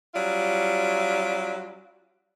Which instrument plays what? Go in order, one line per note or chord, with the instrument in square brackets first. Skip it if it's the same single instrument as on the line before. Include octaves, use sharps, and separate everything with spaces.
[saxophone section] F#3 G3 C#4 F4